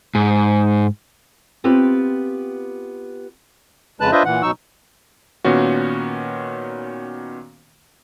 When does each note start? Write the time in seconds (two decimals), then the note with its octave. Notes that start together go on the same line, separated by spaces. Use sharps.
0.15 G#2
1.64 B3 C4 F4 G4 B4
4.01 F2 C#3 G#3 B4 A5 F#6
4.12 D4 F4 B4 C5 D#5 E5
4.25 A#2 E3 F#5
4.43 B2 F#3 D#4 C#6 E6
5.45 A#2 D#3 B3 C#4 F#4